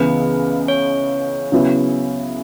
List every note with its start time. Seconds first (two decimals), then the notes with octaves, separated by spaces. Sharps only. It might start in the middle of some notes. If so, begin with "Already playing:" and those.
Already playing: C#2 C#3 E3 B3 B4
0.68 C#5
1.52 C#3 F#3 B3 E4